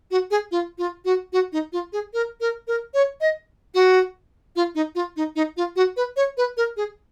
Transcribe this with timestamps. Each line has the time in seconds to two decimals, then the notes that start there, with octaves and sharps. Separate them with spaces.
0.11 F#4
0.31 G#4
0.51 F4
0.78 F4
1.05 F#4
1.33 F#4
1.53 D#4
1.73 F4
1.93 G#4
2.14 A#4
2.41 A#4
2.68 A#4
2.94 C#5
3.21 D#5
3.74 F#4
4.56 F4
4.75 D#4
4.95 F4
5.17 D#4
5.36 D#4
5.57 F4
5.76 F#4
5.97 B4
6.16 C#5
6.37 B4
6.57 A#4
6.77 G#4